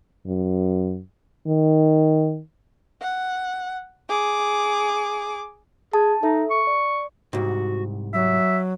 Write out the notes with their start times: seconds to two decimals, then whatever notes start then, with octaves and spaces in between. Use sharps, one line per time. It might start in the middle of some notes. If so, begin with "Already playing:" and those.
0.27 F#2
1.47 D#3
3.01 F#5
4.09 G#4 D6
5.93 G#4 A5
6.23 D#4 A4 E5
6.51 C#6
6.67 D5
7.33 C2 G#2 F#4
8.14 F#3 E5